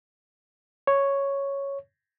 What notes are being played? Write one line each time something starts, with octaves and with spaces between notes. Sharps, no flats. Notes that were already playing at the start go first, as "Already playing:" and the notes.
C#5